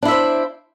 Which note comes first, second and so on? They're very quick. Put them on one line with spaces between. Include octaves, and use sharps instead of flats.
D4 E4 E5 C5